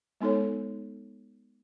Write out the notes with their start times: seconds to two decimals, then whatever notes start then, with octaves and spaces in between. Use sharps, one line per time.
0.21 G#3 B3 D#4 A4 C#5